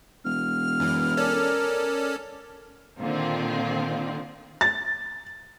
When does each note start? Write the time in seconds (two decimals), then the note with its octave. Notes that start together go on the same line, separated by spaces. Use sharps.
0.25 E1 F6
0.80 F#2 E3
1.17 C#4 A4 A#4 D5
2.99 A#2 D3 D#3 C4 F4
4.61 A6